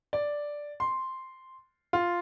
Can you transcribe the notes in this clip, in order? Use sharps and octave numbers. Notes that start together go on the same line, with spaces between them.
D5
C6
F4